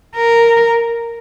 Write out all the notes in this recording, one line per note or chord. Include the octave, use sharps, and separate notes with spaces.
A#4